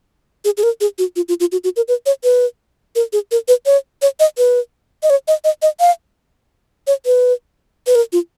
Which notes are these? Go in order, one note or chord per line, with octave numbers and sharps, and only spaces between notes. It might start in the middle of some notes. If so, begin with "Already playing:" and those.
G#4
G#4
A#4
G#4
F#4
F4
F4
F4
F#4
F#4
A#4
B4
C#5
B4
A#4
G#4
A#4
B4
C#5
C#5
D#5
B4
D#5
C#5
D#5
D#5
D#5
F5
C#5
B4
B4
A#4
F4